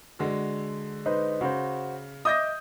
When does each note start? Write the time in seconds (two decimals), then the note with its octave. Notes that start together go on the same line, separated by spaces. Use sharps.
0.19 D3 G#3 F#4
1.06 D#4 B4 C5
1.41 C#3 F#4 C5
2.25 D#5 E5 D6 D#6 G6 A#6